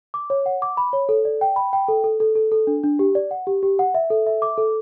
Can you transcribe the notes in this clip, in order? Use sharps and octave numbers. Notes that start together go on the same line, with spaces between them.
D6
C#5
F#5
D6
B5
C#5
A4
D5
G5
B5
G5
A4
A4
A4
A4
A4
D4
D4
G4
D5
F#5
G4
G4
F#5
E5
A4
E5
D6
A4